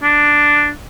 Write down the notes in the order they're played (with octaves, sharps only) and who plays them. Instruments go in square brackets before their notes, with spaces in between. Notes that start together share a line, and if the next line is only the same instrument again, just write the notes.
[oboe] D4